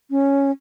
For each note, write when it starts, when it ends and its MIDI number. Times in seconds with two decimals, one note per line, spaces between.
0.11 0.51 61